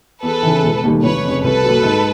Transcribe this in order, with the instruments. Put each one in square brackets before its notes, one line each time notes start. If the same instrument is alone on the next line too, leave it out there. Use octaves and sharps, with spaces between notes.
[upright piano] E2 [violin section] A4 B4
[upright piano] C#3 E3
E1
D#2 D#3 G3
[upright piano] F1 [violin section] B4 C#5
[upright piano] F2 C#3
[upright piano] C2 [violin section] A4 B4
[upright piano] A#2 F#3
G#2